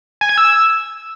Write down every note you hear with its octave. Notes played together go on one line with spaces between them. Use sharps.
G#5
G#6
E6